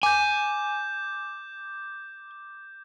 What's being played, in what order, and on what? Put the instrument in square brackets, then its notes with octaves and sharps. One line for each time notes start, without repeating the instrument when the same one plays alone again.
[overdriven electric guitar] G#5 [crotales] D6 G6